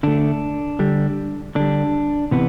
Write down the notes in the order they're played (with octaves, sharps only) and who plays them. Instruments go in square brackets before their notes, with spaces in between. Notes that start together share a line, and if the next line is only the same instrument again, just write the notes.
[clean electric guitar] D3 A3 D4
D3 G3
D3 G3 D4
C3 E3 B3